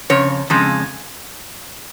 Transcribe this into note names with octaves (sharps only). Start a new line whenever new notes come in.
F2 C#3 C#5
F2 C#3 G#3